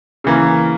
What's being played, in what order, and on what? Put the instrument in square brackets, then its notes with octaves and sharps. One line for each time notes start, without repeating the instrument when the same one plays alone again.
[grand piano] C#3 E3 A#3